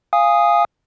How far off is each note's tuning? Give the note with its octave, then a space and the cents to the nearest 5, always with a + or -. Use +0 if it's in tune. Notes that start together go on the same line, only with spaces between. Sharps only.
F5 -10 G#5 -15 D#6 +0